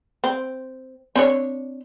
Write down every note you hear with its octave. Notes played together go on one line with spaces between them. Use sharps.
C4
C4 D4 C#5